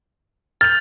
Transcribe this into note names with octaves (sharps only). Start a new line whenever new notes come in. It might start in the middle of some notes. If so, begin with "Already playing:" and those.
F6 G6 A6 F7